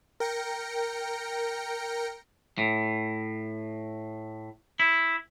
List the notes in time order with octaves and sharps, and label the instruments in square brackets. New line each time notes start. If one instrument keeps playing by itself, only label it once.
[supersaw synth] A#4 G5 A#6 C#7
[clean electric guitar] A2
E4